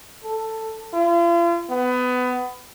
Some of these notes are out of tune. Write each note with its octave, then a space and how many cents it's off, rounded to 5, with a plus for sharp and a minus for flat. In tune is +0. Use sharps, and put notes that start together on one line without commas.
A4 +10
F4 -40
B3 +20